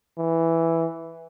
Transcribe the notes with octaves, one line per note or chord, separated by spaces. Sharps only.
E3